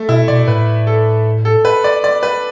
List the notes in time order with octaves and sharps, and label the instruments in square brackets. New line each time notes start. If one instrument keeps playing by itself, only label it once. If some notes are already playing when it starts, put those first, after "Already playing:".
Already playing: [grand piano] A3
[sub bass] B2 [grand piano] E4
[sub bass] B2 [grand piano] D5
[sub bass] A2 [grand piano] B4
[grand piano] A4
A4
B4
D5
D5
B4